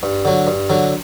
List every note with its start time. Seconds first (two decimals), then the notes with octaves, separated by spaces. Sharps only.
0.03 G2
0.25 D3 F#3
0.47 G2
0.70 D3 F#3